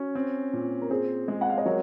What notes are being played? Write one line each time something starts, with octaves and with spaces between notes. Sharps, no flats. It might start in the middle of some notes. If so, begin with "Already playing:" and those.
Already playing: C#4 F#4
C4
A#2
A#4
C4 G#4 C5
G#3
F#5
F5
D#5
F#3 A#4 C#5